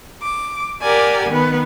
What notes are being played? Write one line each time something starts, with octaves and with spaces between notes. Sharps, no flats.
D6
G4 A#4 D5 F#5 G#5
D#3 B3 B4